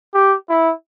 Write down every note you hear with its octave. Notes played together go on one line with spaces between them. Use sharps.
G4
E4